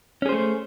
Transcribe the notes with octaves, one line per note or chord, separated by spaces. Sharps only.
A3 C#4 G#4 C5